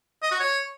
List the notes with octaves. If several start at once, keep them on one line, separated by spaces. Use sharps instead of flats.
D#5
F#4
C#5